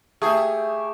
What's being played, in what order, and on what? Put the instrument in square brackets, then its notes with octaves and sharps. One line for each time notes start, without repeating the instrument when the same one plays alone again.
[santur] A3 G4 E5 [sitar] G#4